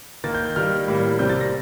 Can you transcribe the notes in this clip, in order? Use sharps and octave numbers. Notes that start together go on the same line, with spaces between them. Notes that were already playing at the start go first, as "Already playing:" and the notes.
D#3 A#3 A6
G6
G6
D#3 G3 A#3 F6
A2 G3 A#3
C3 G3 C4 G6
A6
A#6